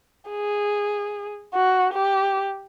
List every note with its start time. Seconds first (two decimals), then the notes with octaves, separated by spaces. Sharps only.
0.30 G#4
1.54 F#4
1.94 G4